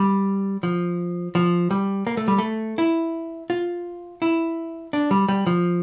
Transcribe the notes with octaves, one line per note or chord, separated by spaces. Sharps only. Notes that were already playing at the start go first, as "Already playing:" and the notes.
Already playing: G3
F3
F3
G3
A#3
A3
G3
A3
E4
F4
E4
D4
G3
G3
F3